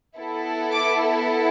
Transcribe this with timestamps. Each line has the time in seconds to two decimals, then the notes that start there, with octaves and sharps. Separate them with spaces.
0.17 B3 E4 A4
0.72 D6